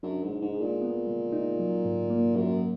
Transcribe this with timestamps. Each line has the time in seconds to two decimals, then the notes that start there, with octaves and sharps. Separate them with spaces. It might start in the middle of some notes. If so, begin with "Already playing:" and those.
0.03 F#2 D4
0.23 G#2
0.29 G#3
0.42 G#2
0.55 G#4
0.61 A#2
0.82 B3
1.07 G#3
1.32 D#4
1.59 F#3
1.85 G#2
2.10 A#3
2.36 F#2 F#3